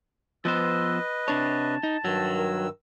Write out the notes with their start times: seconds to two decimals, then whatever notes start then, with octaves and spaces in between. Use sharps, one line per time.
0.45 F3 B3 B4 C5 D#5 E6
1.28 C3 D4 C#5 A5
1.83 D#4
2.05 G2 D#3 F#3 E6
2.38 A#4